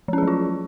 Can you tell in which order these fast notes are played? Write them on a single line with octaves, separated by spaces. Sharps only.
F3 C#4 G#4 F#3 F4